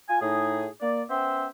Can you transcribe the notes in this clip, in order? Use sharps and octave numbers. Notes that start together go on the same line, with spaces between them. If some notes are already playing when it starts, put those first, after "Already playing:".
F4 G#5
A2 D#4 G#4
A#3 D5
B3 C#4 C5 E5 G5